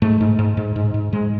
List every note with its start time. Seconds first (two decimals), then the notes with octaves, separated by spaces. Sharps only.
0.02 G#2 A3
0.20 G#2
0.39 G#2
0.57 G#2
0.76 G#2
0.94 G#2
1.12 G#2 G#3